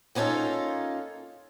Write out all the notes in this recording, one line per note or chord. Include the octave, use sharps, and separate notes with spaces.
A#3 B3 C#4 D#4 F4 A4